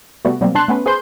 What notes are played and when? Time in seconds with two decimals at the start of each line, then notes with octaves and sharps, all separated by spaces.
0.25 C3 G3 A3 B3 F#4
0.41 B2 F#3 G3 A#3 C4
0.55 B2 D4 A5 C6 F#6
0.68 A3 B3 C#4 B4
0.86 G#4 B4 C5 C6 G6